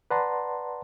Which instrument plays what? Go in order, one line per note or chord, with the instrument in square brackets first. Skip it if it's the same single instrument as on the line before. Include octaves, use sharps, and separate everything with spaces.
[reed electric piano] B4 D5 F#5 A5 A#5 C6